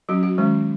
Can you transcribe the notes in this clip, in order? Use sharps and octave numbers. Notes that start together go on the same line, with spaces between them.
F#3 C#4 F#4
F#4
D#3 G#3 C#4